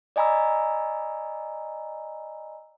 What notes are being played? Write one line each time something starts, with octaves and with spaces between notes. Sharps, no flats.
D5 D#5 G#5 A#5 B5 E6